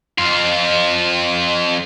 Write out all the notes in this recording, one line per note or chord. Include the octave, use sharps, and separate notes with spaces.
F2 F4